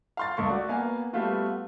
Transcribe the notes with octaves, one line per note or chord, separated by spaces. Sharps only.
F5 C6 A6
C#2 A3 C#6
F#4 D5
A#3 B3 F5 G#5
G3 A3 B3 F4 F#4